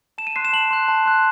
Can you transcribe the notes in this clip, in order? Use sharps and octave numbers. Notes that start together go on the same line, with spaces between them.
A5 E7
D#7
C6 F#6 C7
E7
A5 F#7
C6 F#6
A5
C6 F#6